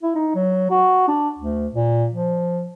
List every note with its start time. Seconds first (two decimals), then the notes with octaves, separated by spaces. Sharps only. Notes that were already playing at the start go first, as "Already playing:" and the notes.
0.03 E4
0.15 D#4
0.35 F#3
0.71 F#4
1.08 D4
1.39 D2
1.73 A#2
2.13 F3